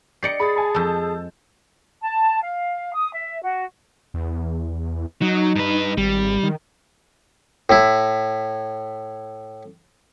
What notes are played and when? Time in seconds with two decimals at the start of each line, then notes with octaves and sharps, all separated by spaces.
0.23 G4 D5 D#5 C7 C#7
0.40 G#4 B5 A6
0.56 G#5 A5 B5
0.74 F2 G#3 A5 E6 G6
2.01 A5
2.43 F5
2.94 D#6
3.14 E5
3.42 F#4
4.14 E2
5.22 F#3 D#4
5.56 G2 B4
5.98 G#1 G3
6.43 D#3
7.70 A2 E4